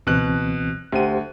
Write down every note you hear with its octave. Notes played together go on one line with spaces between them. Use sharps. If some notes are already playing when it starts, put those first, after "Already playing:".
C#2 B2 E3 C4 F#6
D2 G4 C5 F#5 D#7